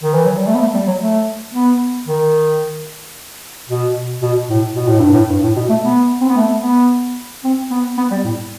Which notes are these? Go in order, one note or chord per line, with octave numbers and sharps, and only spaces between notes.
D#3
E3
F#3
G3
A3
B3
A3
G3
F#3
A3
B3
D#3
B2
B2
A2
B2
A2
G2
A2
G2
A2
B2
A3
B3
C4
B3
A3
B3
C4
B3
B3
G3
A2